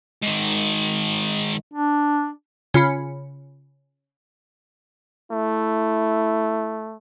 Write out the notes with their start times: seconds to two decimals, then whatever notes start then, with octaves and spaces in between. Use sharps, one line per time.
0.22 G#2 D#3
1.74 D4
2.74 C#3 F4 B5 C#7
5.32 A3 E4